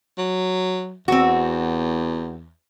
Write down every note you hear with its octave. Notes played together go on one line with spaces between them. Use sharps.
F#3
E2 C4 F#4